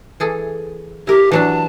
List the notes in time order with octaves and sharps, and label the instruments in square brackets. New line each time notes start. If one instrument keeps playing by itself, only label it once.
[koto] E3 G#4 A4
[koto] E4 A#4 [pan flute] G4
[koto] E3 F#3 D4 [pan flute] A5